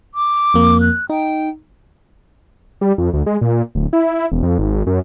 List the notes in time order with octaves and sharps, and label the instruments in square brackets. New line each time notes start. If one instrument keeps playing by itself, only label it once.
[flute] D6
[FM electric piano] F2 A#3
[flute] F#6
[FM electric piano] D#4 [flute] G5
[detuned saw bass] G3
F2
D2
G#3
A#2
D1
E4
E1
F2
G#1
F#2